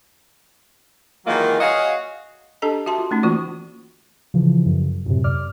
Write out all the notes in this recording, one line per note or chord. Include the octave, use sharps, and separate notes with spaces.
D#3 E3 F#3 G#3 A#3 F4
F#4 G#4 C#5 D#5 F5
D4 G4 A4 D#5 A5 A#5
F#4 E5 A5 C6
F4
A3 C#4 D#4
E3 A#3 F4 F#4 D5
C#3 E3 F3
F#2
F#2 A2 C3
F2 D5 D6 F6